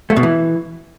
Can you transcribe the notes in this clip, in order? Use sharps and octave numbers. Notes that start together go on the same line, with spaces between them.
A3
B2
E3